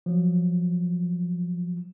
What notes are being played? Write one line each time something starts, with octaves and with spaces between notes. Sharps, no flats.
F3 F#3